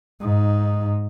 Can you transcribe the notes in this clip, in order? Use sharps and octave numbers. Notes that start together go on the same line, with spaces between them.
G#2 D#4